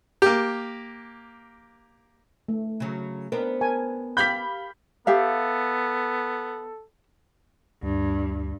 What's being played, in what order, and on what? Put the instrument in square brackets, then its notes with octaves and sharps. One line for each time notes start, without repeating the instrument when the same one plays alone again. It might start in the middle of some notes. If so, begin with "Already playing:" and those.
[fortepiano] A#3 G4
[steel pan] A3
[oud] C#3 F#3
[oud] B3 C4 D4 [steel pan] A#4
[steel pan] A#4 G#5 A5
[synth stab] G4 F5 B5 [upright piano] G6 B6
[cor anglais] B3 [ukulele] G4 E5 F5 [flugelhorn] A4
[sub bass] D2 [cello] G2